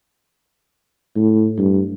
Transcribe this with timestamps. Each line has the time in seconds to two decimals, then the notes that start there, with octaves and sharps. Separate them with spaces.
1.16 A2
1.58 G2